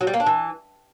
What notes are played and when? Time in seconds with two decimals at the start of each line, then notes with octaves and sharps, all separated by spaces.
0.01 F#3
0.07 G3
0.14 A#3
0.20 D4
0.26 E3